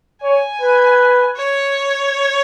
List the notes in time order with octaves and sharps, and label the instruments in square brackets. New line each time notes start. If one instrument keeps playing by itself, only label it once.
[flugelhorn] C#5 [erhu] G#5
[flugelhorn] B4
[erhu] C#5